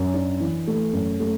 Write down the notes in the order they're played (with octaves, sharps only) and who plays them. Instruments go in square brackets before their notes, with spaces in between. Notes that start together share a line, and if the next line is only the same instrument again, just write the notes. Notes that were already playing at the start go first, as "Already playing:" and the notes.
Already playing: [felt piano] F#2
D4
E3
A3
F#2
A3